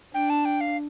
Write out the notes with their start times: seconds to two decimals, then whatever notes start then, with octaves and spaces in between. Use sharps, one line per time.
0.13 D4 G5
0.30 A5
0.45 G5
0.61 F5